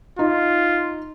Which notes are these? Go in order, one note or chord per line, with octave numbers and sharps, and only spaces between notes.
D#4 F4